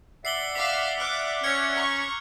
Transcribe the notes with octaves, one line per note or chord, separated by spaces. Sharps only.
D5 E5 F#5 C7 F#7 G7
F5 D6 E6 F6 B6
D6 F6 F#6
C#4 C#5 F6 G#6 C#7
A#5 C#6